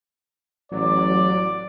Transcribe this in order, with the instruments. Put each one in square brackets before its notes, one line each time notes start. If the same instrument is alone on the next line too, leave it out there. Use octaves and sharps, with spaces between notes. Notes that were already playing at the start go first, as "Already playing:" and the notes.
[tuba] A1 [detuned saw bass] F#3 [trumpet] D5